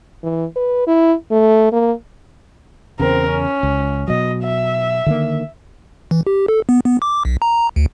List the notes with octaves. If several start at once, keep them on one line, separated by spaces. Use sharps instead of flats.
E3
B4
E4
A3
A#3
E2 C#3 C4 A#4
C#4
C#2
B2 F#3 D#5
E5
D3 D#3 A#3
E3
G4
A4
B3
B3
D6
B1
A#5
D2